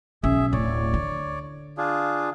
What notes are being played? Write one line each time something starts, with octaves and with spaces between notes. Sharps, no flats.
B1 C#4 G#4 E5
D1 C#5 D5
D3
D4 F4 G#4